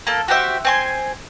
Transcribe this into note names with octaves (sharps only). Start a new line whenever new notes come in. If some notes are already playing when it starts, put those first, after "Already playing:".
A#3 A4
F#4 G4 C5 E5
C4 G#5 C6